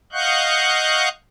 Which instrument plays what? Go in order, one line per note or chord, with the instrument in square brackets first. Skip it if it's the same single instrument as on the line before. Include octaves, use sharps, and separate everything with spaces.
[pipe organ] D#5 F5 F#5 C#6 F#6 G6